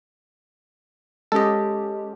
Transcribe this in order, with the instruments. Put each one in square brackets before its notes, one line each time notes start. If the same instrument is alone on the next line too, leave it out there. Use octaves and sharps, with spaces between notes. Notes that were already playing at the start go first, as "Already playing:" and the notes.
[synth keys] G#3 C#4 G4 [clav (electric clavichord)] A4 D#5